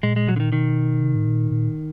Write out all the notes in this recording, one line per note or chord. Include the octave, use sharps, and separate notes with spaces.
A#2 G#3
G#3
F#3
D3
D#3
B2 D#3
C3
A2
A#2
A#2